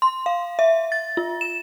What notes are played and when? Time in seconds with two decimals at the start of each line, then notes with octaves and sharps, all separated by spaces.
0.02 C6
0.26 F5
0.59 E5
0.92 A6
1.17 F4
1.41 E7